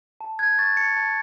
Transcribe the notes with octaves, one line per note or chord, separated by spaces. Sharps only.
A5
F#6 G#6
C#6 A6
A5 C#7
A5